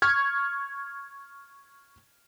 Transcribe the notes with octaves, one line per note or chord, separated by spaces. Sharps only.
C#6 F6 G#6